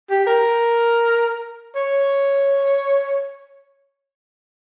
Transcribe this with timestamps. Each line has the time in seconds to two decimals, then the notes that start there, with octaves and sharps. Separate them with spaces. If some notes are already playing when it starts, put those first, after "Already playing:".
0.10 G4
0.26 A#4
1.75 C#5